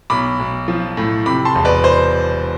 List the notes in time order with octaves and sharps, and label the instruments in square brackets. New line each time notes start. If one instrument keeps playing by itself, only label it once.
[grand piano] B1 B5 D6
B1
F3
A2
C3 B5 D6
A5 C6
E1
B4 D5
C5